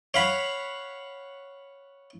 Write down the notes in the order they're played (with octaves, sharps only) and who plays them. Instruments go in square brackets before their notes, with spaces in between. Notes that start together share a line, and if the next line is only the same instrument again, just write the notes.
[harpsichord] C#5 F5 F#5 B5